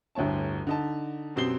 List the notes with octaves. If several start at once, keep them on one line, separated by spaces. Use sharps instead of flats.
G1 D2 A2 C#5 A5
D3 D#4 A5
F#2 B2 C4 G4 C7 G7